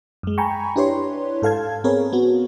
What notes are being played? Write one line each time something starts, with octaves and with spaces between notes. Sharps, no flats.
F#2 G#3
G5 G#5 A#5 B5 C#6
D4 E4 G4 B4 C#5 C6
G#2 A4 F5 A5 G#6
B3 C4 G#4 A#4 B4 C#5
B3 F#4